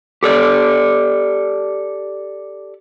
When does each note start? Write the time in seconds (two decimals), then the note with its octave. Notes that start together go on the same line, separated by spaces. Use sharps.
0.23 G4 A4 D5